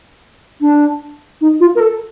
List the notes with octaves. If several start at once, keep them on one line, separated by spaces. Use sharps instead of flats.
D4
D#4
F4
A#4
A4